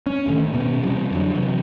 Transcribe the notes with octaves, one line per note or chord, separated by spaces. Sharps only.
C#4
D2 A2 D#3 A3
D#1 B2 B3 C#4
C3 E3 F3 G3
F2 D3 F#3
C3 E3 F#3